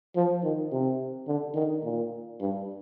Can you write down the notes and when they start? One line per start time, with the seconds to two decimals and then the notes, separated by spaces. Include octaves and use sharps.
0.16 F3
0.43 D#3
0.72 C3
1.27 D3
1.55 D#3
1.84 A#2
2.40 G2